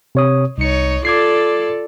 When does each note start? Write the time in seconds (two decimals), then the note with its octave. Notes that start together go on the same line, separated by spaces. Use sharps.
0.15 C3 C#5 D#6
0.58 C2 D#4 C#5 C#7
1.05 F4 A4 D5 D6 G#6 C7